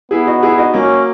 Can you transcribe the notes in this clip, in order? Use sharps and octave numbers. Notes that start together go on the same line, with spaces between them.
B3 E4 G#4
D#4 F#4
E4 G#4
D#4 F#4
F#3 A#3 C#4